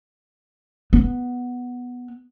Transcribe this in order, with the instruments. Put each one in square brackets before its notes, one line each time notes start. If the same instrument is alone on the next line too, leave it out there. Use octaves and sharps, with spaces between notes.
[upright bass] B3